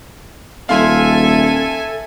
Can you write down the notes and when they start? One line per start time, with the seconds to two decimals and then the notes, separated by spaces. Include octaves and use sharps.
0.69 D#1 A4 E5 F5 G#5 C6